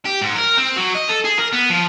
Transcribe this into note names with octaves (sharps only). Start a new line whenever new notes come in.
G4
G#2
A#4
C4
F#3
D#5
A4
G#4
A#4
B3
F3